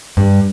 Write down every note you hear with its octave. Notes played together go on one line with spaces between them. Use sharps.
G2